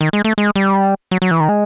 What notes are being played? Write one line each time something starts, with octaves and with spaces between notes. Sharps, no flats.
D#3
G#3
A3
G#3
G3
F#3
F#3
E3
D#3
G#3